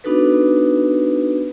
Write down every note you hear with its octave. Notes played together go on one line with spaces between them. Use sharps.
B3 D4 D#4 F#4 A4 B4